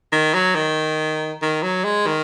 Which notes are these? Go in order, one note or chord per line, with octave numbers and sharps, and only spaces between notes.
D#3
F#3
D#3
D#3
F#3
G#3
D#3